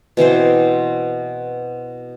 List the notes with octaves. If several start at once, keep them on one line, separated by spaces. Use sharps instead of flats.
B2 E3 C4 C5